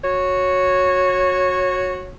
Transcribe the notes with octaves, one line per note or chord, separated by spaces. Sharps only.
F#4 C#5